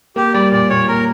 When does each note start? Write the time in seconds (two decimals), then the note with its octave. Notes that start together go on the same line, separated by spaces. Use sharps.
0.16 A#3 G4
0.34 G3 D5
0.52 A#2 D5
0.70 A#2 C#5
0.88 A#3 A#4